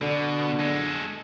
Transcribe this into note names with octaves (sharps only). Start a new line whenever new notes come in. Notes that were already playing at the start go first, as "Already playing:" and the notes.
B2 D3
G#3 A4